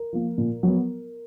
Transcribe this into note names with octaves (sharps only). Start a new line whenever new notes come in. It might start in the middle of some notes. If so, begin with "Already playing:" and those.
Already playing: A#4
F3 A#3
A#2
F#3 B3